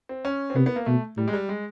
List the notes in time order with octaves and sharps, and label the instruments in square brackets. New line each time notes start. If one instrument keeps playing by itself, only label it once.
[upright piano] C4
C#4
C4
[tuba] C3 [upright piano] B3
[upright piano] B3
A#3
[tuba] B2 [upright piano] A3
[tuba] A2 [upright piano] G3
[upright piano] G#3
G3
G#3